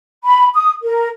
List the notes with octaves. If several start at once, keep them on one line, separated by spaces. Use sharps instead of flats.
B5
D#6
A#4